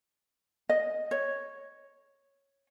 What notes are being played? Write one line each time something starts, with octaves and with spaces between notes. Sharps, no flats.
D#5
C#5